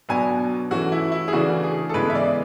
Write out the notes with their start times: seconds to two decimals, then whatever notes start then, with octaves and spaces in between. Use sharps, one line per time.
0.09 B2 F#3 B3 D4 G#5
0.71 E3 A3 C#4 F#4
0.92 E4
1.12 E4
1.28 G#4
1.33 C#3 E3 A3 D4 F#4
1.63 G#4
1.89 A4
1.94 C#3 E3 G#3 B3 B4
2.10 E5
2.15 D5